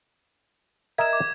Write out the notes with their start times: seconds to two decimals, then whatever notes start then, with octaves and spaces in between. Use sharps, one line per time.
0.98 A#4 D#5 E5 G#6 E7
1.13 D6